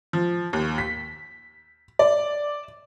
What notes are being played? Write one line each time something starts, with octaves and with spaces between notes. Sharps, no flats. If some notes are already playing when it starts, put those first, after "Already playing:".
F3
D#2
B6
D5